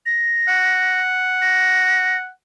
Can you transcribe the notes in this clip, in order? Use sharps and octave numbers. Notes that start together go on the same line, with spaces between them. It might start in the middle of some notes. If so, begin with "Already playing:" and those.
A#6
F#5
A#6